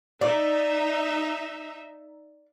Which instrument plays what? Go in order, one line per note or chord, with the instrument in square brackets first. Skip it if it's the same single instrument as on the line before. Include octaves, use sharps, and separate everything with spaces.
[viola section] D#4 E5 [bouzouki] D5